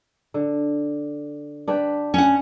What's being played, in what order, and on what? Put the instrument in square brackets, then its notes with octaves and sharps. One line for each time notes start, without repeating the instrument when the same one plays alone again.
[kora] D3
D4 G4 B4
[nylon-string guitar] C#4 F#5